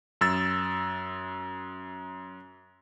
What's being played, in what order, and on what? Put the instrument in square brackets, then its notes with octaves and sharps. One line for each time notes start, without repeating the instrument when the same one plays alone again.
[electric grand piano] F#2 E6 A6